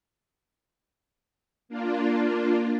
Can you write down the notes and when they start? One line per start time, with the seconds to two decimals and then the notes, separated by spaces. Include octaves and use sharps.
1.69 A#3 D4 F4